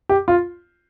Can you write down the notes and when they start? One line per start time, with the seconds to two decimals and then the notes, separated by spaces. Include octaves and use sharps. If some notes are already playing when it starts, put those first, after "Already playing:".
0.09 G4
0.28 F4